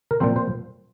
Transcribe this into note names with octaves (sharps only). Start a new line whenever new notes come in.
A#4
A#2 F3 C4 C5
C5